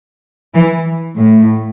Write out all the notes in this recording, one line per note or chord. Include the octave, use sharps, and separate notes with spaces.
E3
A2